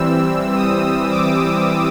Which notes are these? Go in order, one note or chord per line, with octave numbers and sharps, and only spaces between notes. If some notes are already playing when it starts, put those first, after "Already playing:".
Already playing: E3 G3 C4 E6
D#6
D6